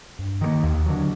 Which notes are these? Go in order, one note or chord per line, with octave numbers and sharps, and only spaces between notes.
G2
D#3 G3 A#3
D#2
D3 F#3